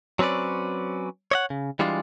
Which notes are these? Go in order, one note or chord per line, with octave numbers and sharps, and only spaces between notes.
F#3 C4 C#4 B4 D5
C#5 D#5 F#5
C#3
E3 G3 G#3 D4 F4